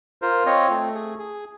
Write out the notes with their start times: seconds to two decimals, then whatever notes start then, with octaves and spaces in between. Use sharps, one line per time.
0.22 F4 A#4 C5
0.46 C4 C#5 D#5
0.70 A3
0.95 G#4
1.19 G#4